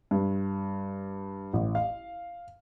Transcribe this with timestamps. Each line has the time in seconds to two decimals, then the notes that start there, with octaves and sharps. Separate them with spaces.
0.11 G2
1.53 A1
1.75 F5